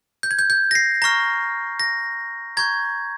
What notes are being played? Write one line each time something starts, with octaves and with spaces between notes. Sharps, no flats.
G6
G#6
G6
G6
A#6
C7
A#5 C#6 F6 A#6
A#6
A#5 C#6 G6 G#6